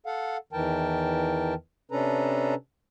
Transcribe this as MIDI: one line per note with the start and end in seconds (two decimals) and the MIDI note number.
0.06 0.37 69
0.06 0.37 77
0.06 0.37 78
0.53 1.54 40
0.53 1.54 51
0.53 1.54 52
0.53 1.54 70
0.53 1.54 79
0.53 1.54 81
1.91 2.55 48
1.91 2.55 61
1.91 2.55 62
1.91 2.55 69
1.91 2.55 71
1.91 2.55 82